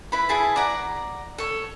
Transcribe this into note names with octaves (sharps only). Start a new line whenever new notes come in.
E4 B4 B5
E4 G#4 A5
D5 F#5 A#5
A4 C#5